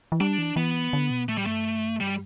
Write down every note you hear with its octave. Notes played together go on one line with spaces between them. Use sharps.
E3
G3 D4
E3
E3 B3
D3
B2
A2 A3
G3
G2 A3
G3